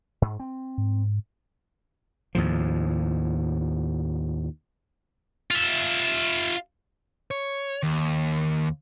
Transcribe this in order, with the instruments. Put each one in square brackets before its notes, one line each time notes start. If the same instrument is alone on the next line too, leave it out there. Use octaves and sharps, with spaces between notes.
[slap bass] G#2
C4
[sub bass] G#2
[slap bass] D#2 A2 F3
[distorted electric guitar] F4 E5
[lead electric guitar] C#5
D#2